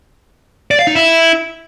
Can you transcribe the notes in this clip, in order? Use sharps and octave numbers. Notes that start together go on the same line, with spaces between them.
D5
F5
D#4
E4